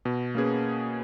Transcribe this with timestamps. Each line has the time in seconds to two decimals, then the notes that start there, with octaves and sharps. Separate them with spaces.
0.05 B2
0.35 A#3 C#4 G#4 B4